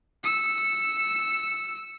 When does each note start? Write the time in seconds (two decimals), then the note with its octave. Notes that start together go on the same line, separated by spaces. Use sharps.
0.24 E6 C#7